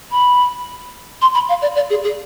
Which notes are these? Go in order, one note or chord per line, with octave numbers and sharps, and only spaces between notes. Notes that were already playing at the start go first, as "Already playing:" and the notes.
B5
C6
B5
F5
D5
D5
G#4
G#4